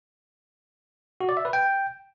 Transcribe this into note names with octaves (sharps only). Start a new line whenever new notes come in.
F#4
D5
E5
B4
G5